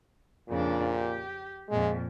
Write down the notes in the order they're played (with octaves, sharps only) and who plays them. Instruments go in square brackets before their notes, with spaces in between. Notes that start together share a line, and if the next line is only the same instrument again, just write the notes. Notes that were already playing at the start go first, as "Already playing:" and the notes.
[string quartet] F2 C#3 D4 [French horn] A#2
[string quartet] G4
[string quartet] F2 A#2 [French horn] G#3